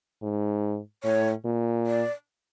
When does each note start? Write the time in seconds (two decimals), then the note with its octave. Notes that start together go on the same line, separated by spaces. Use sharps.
0.22 G#2
1.04 A2 C#5
1.45 A#2
1.87 D5